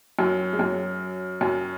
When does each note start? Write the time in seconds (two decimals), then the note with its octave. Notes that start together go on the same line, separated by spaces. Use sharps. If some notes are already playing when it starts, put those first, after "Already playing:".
0.19 F#2 F#3
0.53 G#3
0.59 F#2 F#3
1.41 F#2 F#3